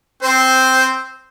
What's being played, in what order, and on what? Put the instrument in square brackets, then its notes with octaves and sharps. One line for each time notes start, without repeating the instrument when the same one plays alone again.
[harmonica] C4 C5